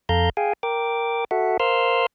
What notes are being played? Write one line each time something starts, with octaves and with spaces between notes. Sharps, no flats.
F2 A4 F5 A#5 G6
G#4 F5 G5 G#5
A#4 G5 D6
F#4 A4 E5 F#5
A#4 C5 F5 C6 E6 F6